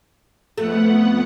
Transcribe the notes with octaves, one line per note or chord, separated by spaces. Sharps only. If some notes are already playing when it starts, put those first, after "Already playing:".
F2 A3 B3 F#5